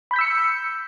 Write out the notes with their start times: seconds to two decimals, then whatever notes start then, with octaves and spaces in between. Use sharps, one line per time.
0.11 B5
0.14 G6
0.16 B6
0.19 E6
0.21 C#7